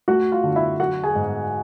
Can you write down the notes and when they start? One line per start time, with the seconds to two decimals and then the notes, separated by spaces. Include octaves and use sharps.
0.08 A3 F#4 F#5
0.32 F4 F5
0.44 D3
0.56 E4 E5
0.80 F#3 F#4 F#5
1.03 G#4 G#5
1.15 G#2